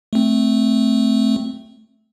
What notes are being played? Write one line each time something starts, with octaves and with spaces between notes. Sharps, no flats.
A3 C4